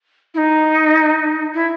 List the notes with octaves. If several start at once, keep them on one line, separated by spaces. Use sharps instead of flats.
E4
D#4
E4